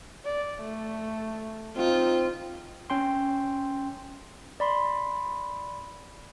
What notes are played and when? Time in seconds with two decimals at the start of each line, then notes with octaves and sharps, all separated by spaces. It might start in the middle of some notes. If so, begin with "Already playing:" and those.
0.25 D5
0.61 A3
1.77 C4 D#4 F4
2.90 C#4 G5 C6
4.60 D5 B5 C6